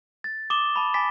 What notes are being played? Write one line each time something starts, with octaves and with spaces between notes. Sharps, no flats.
A6
D6 D#6 E7 G7
A5 B5
G#5 B5 D6 A6 B6